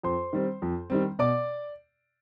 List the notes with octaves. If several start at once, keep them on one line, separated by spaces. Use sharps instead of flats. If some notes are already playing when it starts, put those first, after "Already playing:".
F2 C5 C6
D#3 G3 C4
F2
D#3 G3 C4
B2 D5 D6